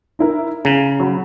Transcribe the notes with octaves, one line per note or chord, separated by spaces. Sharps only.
D#4 E4 A#4
C#3 A#5
F#3 B5